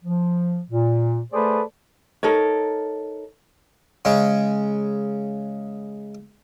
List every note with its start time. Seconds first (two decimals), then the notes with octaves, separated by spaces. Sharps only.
0.04 F3
0.69 A#2
1.33 A3 G#4 A4 B4 C5 D5
2.23 D#4 A4 A#4 C#5
4.05 C#3 G#3